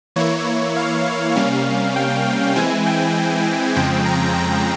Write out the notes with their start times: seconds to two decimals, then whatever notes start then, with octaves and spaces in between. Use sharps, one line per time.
0.16 E3 A#3 E4 C#5
0.76 F5
1.36 C3 G3 A#3 C#4
1.96 G5
2.55 E3 G#3 C4 E4 G#5
2.86 G5
3.75 F2 C#3 F3 G#3 C4 G5
4.06 A#5
4.36 A#5